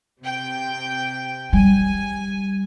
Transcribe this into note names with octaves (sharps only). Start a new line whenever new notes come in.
C3 G5
G3 G#5